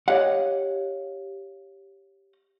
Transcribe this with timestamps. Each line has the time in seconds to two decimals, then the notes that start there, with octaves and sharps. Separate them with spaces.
0.08 G4 C#5 D#5 F5 F#5